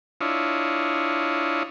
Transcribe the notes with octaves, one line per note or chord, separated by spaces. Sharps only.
D4 E4 F4 C#5 D#5